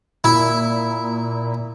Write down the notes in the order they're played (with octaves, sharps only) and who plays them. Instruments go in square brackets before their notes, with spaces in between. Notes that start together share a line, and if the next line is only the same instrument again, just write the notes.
[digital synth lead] A#2 [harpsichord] E4